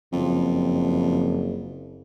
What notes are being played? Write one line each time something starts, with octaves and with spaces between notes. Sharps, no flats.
F#1 F2